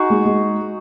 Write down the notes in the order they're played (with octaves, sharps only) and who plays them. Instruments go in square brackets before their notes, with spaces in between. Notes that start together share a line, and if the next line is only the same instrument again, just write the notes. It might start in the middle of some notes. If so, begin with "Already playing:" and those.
Already playing: [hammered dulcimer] D#4 F#4 G#4
[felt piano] G#3
G#3